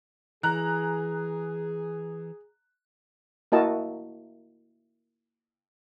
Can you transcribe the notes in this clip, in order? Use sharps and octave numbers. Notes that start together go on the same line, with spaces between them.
E3 G#4 A#5 F#6
A#3 E4 F#4 A#4 D#5 A5